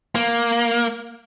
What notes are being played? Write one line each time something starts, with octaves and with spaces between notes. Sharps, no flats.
A#3